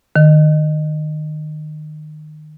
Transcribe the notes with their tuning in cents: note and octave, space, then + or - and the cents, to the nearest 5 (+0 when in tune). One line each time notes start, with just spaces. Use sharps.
D#3 -25